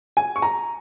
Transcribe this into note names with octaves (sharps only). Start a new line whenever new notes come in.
G#5
C#6
A#5